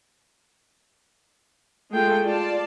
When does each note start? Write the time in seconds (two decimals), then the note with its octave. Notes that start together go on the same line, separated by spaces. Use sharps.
1.93 G#3 A3 F4 G#4 A4 G5
2.23 F4 D5 A5